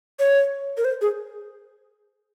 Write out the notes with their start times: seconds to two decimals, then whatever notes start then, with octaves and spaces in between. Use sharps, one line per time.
0.19 C#5
0.77 A#4
0.85 C5
1.01 G#4